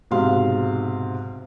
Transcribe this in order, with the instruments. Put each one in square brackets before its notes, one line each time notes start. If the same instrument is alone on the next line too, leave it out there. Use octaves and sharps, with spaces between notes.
[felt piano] B1 G#2 C3 F5 C6